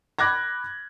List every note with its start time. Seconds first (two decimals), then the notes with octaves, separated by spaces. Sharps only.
0.19 B5 D6 F#6 G#6 A#6